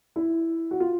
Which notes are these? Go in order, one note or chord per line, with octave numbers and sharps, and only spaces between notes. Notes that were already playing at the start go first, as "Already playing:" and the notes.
E4
F#4
F4